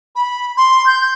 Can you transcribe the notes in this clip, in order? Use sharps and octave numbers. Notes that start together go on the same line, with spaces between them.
B5
C6
G6